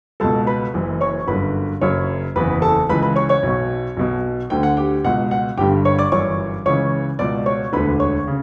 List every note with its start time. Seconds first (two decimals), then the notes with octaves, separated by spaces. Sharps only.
0.20 C#2 B2 A4 A5
0.47 B4 B5
0.74 F#1 F#2 E3
1.01 C#5 C#6
1.27 G1 F#2 D3 B4 B5
1.81 F#1 F#2 C#3 C#5 C#6
2.36 F#1 E2 C#3 E3 B4 B5
2.62 A4 A5
2.89 C#2 C#3 E3 B4 B5
3.02 B4 B5
3.16 C#5 C#6
3.29 C#5 C#6
3.43 B1 B2
3.97 B1 B2
4.50 D2 D3 G5
4.63 F#5
4.77 G4 G5
5.04 C#2 B2 F#5
5.31 F#5
5.58 G1 G2 D3 G4 G5
5.85 C#5 C#6
5.99 D5 D6
6.12 G1 F#2 E3 C#5 C#6
6.65 C#2 C#3 E3 C#5 C#6
7.19 C#2 B2 D5 D6
7.46 C#5 C#6
7.73 E1 D2 D3 B4 B5
8.00 C#5 C#6
8.27 C#3